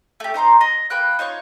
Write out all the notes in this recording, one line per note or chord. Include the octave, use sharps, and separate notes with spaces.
A3 G4
D#4 C5 A#5 C6
D#5
A#3 B4 G5 F#6
D#4 F4 C#5 C#6